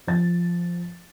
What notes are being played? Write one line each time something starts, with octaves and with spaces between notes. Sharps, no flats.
F3 A6